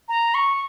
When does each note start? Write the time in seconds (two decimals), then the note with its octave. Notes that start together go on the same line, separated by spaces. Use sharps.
0.09 A#5
0.34 C#6